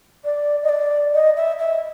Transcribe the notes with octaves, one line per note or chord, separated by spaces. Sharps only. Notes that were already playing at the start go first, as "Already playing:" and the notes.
D5
D#5
D5
D#5
E5
E5